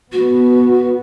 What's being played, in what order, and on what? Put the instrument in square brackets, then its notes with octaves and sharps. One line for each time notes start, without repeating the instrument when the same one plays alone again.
[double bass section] B3 [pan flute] F#4